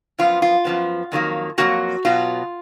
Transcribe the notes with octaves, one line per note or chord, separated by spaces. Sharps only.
F#2 F3 B3 F4
F4
F#2 F3 B3
F2 D#3 F#3 A#3
F2 D#3 F#3 A#3 F#4
B2 F#3 B3 F4